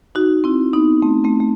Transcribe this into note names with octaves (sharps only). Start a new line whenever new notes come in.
D#4 F#4
C4 E4
B3 D#4
A3 C4
A3 C4
A3